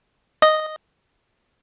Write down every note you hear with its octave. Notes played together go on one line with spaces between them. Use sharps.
D#5